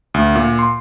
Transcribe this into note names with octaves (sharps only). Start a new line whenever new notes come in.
D2
A#2
C6